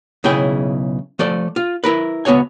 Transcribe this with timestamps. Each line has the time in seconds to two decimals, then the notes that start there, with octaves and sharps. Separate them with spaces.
0.24 B1 C#3 E4 G#4 G5
1.19 F3 A3 A4 D5
1.56 F4
1.84 E4 A#4 B4
2.25 C#2 B3 F#4 C#5 G#5